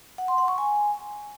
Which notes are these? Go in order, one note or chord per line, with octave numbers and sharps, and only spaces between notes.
F#5
C6
F#5
C#6
G#5